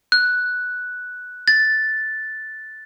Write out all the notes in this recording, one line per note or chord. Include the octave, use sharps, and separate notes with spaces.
F#6
A6